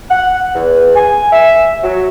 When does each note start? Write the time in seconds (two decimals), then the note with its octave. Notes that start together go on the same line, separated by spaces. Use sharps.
0.10 F#5
0.54 E2
0.96 G#5
1.32 E5
1.83 F#3